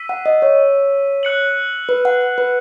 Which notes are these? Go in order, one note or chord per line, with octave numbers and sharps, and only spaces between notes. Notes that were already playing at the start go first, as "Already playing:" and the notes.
Already playing: E6 B6 D#7
F#5
D#5
C#5
F#6 C#7 F#7
B4
F#5
F#5
B4